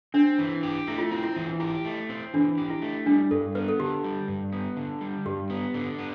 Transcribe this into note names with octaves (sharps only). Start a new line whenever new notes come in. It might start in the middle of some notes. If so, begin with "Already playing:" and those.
C4 D4
E3
G4
A3 E4
F4
C4 E4
E4
E3
E4 G4
A3
C4
E3 D4
G4
E4
A3
G3 D4
G2 A4
B3 B4
A4
D3 G4
G3
G2
B3
D3
G3
G2 G4
B3
D3
B3